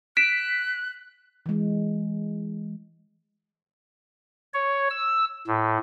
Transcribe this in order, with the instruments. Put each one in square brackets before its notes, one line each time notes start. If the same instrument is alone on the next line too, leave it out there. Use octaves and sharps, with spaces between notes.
[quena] F#6 [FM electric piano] B6 [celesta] D7 E7
[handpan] E3 G#3
[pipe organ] C#5
E6
A2